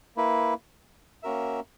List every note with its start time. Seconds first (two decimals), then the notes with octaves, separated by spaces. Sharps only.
0.17 A#3 E4 B4
1.23 A#3 C#4 F#4 A#4 E5